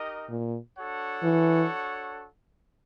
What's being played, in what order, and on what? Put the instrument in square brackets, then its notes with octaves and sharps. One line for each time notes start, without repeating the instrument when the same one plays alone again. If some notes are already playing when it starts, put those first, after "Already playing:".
Already playing: [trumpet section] D#4 G4 A#4 D#5
[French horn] A#2
[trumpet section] D4 F#4 A4 C#5 F#5
[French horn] E3